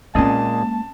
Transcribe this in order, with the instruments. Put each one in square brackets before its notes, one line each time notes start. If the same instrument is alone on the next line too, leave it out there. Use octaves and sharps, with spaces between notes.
[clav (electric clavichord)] A#2 G#4 D#5 [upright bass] G#3 A#3 [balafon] C4 C#4 [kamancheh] A5